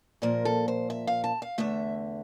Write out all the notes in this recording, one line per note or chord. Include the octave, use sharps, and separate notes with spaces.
A#2 F3 A#3 A#4
A4
C5
E5
F5
A5
F5
E2 D3 A3 E5